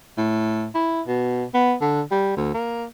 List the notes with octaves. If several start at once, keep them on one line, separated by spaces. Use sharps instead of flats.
A2
E4
B2
B3
D3
G3
D2
A#3